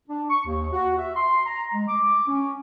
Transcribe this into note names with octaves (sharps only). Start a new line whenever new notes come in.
D4
C#6
D#2
F#4
E5
C6
A#5
G#3
D6
C#4